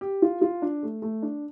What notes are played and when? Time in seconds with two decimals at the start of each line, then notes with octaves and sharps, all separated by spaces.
0.01 G4
0.22 F4
0.41 F4
0.62 D4
0.83 A3
1.02 A3
1.22 D4